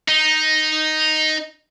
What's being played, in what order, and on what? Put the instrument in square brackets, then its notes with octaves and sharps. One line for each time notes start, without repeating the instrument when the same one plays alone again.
[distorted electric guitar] D#4